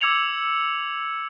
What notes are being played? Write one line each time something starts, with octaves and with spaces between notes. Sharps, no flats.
D6 E6 G#6 C#7 F7 F#7